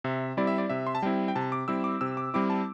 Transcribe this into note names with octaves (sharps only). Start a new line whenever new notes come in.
C3 E5
G3 C4 E4 D5
E5
D5
C3 E5
C6
A5
G3 C4 E4 G5
G5
C3 A5
D6
G3 C4 E4 E6
D6
C3 E6
D6
G3 C4 E4 D6
A5